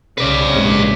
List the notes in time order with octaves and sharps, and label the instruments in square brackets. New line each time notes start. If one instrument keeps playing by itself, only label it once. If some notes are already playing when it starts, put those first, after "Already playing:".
[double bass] C2 C#3 [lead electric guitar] B4 D5 [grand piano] C5
[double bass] A#1 [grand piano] G#2 C3